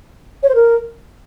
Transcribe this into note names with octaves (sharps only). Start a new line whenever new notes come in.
C#5
C5
A#4